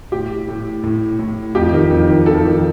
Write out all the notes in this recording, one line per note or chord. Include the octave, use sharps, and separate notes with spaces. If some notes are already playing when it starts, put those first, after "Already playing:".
A2 G4
A2
A2
A2
F2 G4
D#3
F2
D#3
F2 A4
D#3